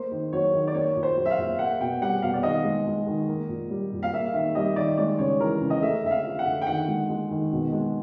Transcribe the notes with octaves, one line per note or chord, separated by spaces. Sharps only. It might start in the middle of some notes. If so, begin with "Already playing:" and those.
Already playing: A#3 C5
D#3
F#3 C#5
D#3
D5
A#3 C#5
A#2
C5
F#3
E5
F5
A#2
A#3 F#5
B2 G5
G3 F#5
B2 F5
D5
D#3 D#5
G#3
G#3
D#3
A#3
A#2
G3
A#2
F5
A#3 E5
D#3 E5
G3 D#5
D#3 D5
G#3 D5
C#3 C#5
E3 A#4
C#3
D#5
A3 E5
D3 E5
F5
F3
F#5
D3
G5
D#3 F#5
G#3
G#3
D#3
B2
G#3